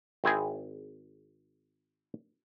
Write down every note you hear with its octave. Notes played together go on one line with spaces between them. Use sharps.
G#1 C4 E4 G#4